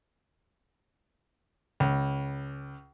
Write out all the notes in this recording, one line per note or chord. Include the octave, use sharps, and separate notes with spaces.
C#2